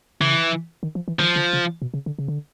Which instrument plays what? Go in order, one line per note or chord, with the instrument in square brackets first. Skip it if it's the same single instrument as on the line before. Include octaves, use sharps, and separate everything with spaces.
[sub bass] C#3 [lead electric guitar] E3
[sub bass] D#3
F3
E3
[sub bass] D#3 [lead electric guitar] F3
[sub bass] D3
C#3
B2
C#3
D3
C#3
D3